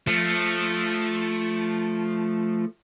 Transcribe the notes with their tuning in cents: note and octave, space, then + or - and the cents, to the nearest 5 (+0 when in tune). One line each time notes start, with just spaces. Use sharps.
F3 +0 A3 +0